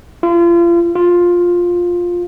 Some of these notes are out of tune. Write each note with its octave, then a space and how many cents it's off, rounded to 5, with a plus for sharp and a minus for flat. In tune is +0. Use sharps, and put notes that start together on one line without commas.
F4 -35
F4 +10